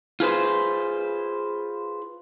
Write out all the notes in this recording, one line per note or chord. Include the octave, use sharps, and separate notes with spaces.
F4 G#4 B4 C5